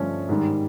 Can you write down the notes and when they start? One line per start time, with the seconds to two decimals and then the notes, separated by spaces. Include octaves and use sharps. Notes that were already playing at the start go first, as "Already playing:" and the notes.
Already playing: G2 D3 F3 A3 C#4
0.29 G#2 D#3 G3